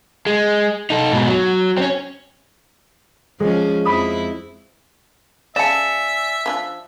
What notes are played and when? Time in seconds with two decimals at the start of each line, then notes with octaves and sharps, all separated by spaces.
0.26 G#3
0.90 D#4 A4
1.12 G#2 B2
1.28 F#3
1.78 C4 C#4
3.40 F3 G#3 C#4
3.85 F2 C4 E4 B5 D#6
5.56 C#3 D5 E5 G#5 A5 C#7 E7
6.46 F3 C#4 D4